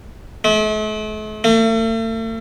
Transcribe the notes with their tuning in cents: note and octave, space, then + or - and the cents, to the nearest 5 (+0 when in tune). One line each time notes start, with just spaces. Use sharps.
A3 -45
A3 +40